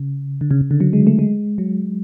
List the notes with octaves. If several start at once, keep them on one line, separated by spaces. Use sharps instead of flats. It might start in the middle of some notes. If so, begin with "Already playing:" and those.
Already playing: C#3
D3
C#3
C#3
D3
F#3
G#3
A3
G#3
F#3